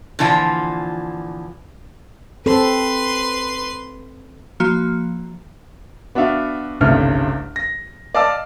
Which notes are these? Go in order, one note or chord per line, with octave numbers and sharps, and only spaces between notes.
A#2 D3 E3 F3 F4
C4 A4 B4 C6
F3 A#3 F#4 F6
B3 D4 F#4 E5 F5
G1 C2 G2 C#3 A3 F6
A#6
D5 D#5 F5 A5 D6 E6